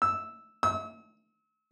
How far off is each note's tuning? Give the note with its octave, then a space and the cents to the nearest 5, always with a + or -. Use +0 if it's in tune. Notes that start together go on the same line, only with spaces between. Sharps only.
E6 -5
E6 -40